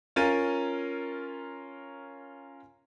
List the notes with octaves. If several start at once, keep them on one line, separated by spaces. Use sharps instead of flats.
C#4 F4 A#4 A6 D#7